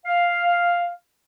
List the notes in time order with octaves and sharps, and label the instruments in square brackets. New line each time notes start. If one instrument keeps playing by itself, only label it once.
[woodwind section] F5